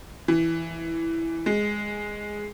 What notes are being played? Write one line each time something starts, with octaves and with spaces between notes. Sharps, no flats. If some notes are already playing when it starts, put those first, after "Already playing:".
E3
G#3